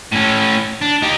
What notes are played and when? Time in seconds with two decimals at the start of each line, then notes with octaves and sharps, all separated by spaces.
0.12 A2 C#4
0.81 D4
1.02 D#4 G4